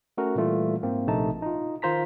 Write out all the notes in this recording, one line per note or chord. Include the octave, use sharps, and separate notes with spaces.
A3 C#4 F#4 A#4
A#2 E3 G3 A3 F4
G#2 A#3 C4
A#1 C3 A3 D#4 A5
D#4 F4
D#3 F4 C5 A#5 B6